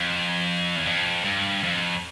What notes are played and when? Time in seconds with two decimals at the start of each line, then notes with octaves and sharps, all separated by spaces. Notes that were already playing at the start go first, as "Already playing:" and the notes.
Already playing: F2
0.76 E2
0.85 F2
1.25 G2
1.64 F2